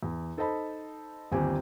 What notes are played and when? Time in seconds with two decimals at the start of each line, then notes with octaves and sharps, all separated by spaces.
0.03 E2
0.37 D#4 A4 C5 D#5 A5 B5
1.31 G1 D#2 C4 G4 G#5